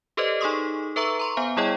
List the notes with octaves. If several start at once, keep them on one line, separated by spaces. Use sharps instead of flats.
G4 A4 B4 C5 D5 D#5
D#4 G#4 A4 C6 C#6 D#6
A4 B4 E5 A#5 C#6 E6
A#5 C6 C#6
B3 C5 F5 G#5
G3 E4 G#4 C#5 D#5 G5